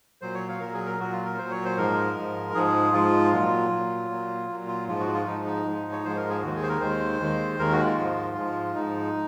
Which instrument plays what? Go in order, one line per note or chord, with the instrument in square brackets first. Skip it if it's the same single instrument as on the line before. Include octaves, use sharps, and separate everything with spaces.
[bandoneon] A#2 F#3 C5
C#5
F5
A#2 F#3 A#4
G#4
A#4
A#2 F#3 F#4
F4
A#4
A#2 F#3 C5
C#5
C5
G#2 F3 G#3 A#4
G#2 F3 G#3
G#2 F3 G#3 G#4
G#2 F3 G#3 F4
A#2 F#3
A#2 F#3
A#2 F#3
A#2 F#3
F4
G#2 F3 G#3 F4
F#4
F4
G#2 F3 G#3 D#4
D#4
G#2 F3 G#3
C#5
G#2 F3 G#3 C5
A#4
G#4
D#2 D#3 G#3 F#4
G#4
C5
A#4
D#2 D#3 G#3 C5
D#2 D#3 G#3
D#2 D#3 G#3 A#4
F#4
F4
G#2 F3 G#3
G#2 F3 G#3
G#2 F3 G#3 D#4